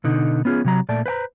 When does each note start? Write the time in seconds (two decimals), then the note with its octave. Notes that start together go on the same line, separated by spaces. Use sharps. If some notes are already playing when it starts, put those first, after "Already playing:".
0.04 B2 D3 D#4
0.45 B3 C#4 F4 F#4 G#4
0.64 C3 F#3 A#5
0.89 A#2 A3 D5 A5
1.06 B4 C5 G5 A#5